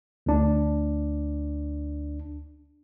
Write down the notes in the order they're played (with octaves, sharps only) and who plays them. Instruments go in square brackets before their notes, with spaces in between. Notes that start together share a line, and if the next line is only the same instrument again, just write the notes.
[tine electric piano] D2 D4